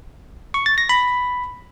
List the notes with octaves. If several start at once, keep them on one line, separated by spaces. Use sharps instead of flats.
C#6
A6
A#6
B5